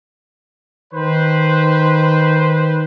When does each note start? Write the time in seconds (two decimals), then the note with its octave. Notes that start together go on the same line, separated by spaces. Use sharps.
0.94 D#3 B4 C5